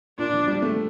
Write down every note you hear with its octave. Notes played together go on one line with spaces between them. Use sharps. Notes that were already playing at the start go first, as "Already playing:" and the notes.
A#2 D4
F3
G3
A3